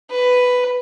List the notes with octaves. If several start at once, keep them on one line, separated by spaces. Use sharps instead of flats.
B4